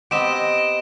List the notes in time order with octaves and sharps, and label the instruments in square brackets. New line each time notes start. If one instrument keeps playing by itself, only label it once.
[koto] B3 C4 G4 [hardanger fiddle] D#5 [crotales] D7 E7